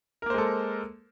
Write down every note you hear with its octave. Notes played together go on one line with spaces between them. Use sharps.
G#3 A#3 A4 A#4 C5